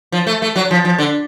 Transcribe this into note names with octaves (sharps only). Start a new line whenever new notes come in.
F3
A3
A3
F#3
F3
F3
D3